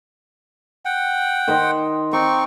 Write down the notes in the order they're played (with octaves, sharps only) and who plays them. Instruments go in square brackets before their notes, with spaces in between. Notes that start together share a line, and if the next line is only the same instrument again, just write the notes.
[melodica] F#5 G5
[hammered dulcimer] D#3 C5 D#5
[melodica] C4 D#4 C#6 [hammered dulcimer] D6